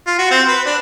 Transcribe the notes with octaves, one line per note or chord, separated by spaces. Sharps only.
F4
F#4
C4
B4
D4